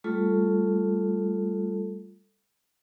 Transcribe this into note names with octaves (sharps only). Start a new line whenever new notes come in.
G3 A3 F4 A4